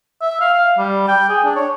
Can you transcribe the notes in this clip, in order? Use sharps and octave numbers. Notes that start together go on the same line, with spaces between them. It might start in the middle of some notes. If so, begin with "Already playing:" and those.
E5
F5
F5
G3
G5
G#4
D4
C#5